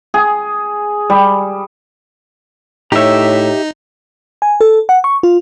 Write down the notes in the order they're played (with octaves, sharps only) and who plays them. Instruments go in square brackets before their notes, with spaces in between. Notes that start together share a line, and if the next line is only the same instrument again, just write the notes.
[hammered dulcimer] G#4
G3
[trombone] A2 [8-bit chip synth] D#4 [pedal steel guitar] G4 E5 [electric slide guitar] C#5 A#5
[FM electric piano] G#5
A4
F#5
C#6
F4